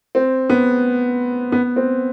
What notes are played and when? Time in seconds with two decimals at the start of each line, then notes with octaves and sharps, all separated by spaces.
0.15 C4
0.50 B3
1.52 B3
1.76 C4